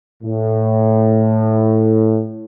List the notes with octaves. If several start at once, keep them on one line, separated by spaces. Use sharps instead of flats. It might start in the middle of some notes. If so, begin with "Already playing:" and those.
A2